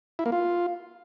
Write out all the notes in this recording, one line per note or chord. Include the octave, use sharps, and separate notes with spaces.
E4
A#3
F4